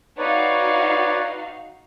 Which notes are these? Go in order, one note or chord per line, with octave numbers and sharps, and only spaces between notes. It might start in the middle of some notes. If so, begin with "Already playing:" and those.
D#4 F#4 B4 C#5 D5 F5